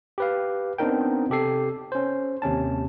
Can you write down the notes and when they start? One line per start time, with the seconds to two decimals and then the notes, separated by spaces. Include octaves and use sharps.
0.18 G4 B4 F5
0.78 B3 C4 D4 D#4 A#4 G5
1.30 C3 G4 A4 C7
1.92 C#4 C5
2.42 D#2 C3 C#4 A5